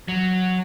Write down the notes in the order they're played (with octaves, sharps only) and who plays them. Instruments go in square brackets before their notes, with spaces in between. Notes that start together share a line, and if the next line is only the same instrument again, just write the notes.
[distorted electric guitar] F#3